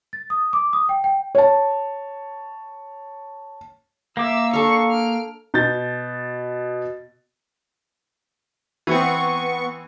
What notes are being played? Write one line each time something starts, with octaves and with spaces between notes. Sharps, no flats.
A6
D#6
D6
D#6
G5
G5
C#5 A5
A#3 E5 D6 E6
D4 A4 F5 C#6
F6 D7
B2 G6 A6
E3 B3 C4 C#6